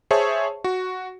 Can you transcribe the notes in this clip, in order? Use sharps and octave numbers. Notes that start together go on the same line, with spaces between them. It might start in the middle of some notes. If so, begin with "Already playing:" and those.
G#4 C5 C#5 E5 A5 C#6
F#4